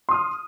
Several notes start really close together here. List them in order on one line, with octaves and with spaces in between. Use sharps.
C6 D#6 F6